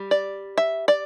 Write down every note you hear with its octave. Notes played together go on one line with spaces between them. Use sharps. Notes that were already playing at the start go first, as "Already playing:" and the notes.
Already playing: G3
D5
E5
D5